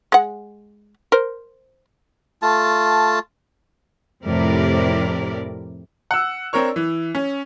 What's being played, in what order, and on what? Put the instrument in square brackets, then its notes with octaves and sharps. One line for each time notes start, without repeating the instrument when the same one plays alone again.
[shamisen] G#3 F#5
A#4 C5
[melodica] A3 F4 A5
[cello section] F2 A2 C3 E4 A#4 D5
[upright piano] F#5 E6
C4 D4 A#4 C#5 C#6
E3
C#4